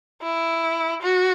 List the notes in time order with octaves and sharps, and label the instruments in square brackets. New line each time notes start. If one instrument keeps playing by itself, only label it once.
[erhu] E4
F#4